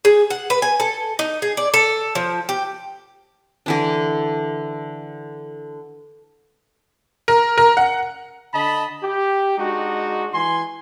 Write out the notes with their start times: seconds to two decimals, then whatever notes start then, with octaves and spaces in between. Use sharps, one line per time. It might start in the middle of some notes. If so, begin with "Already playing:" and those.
0.05 G#4
0.30 F#5
0.50 B4
0.62 G#5
0.80 A4
1.19 D#4
1.42 G#4
1.57 D5
1.74 A4
2.15 F3
2.49 G4
3.66 D3 E3 D4
7.28 A#4
7.58 A#4
7.77 F#5
8.54 D3 D#5 A5 B5
9.03 G4
9.58 G#3 D4 D#4 F#4
10.34 E3 G#5 C6